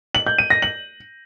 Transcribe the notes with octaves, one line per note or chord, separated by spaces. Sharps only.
F#7
G6
D#7
A#6
F#7